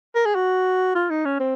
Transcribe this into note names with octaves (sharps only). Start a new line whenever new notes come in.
A#4
G#4
F#4
F4
D#4
C#4
C4